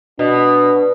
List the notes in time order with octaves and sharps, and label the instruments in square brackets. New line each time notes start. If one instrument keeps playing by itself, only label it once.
[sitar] B2 [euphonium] D4